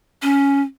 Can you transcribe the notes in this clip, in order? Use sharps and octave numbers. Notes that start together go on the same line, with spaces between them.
C#4